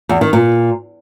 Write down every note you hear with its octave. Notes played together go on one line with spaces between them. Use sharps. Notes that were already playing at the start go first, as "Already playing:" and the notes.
E2
D#3
A#2